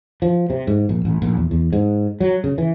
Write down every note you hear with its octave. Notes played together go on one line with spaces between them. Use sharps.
F3
C3
G#2
A#1
A1
A#1
E2
E2
G#2
F#3
C#3
E3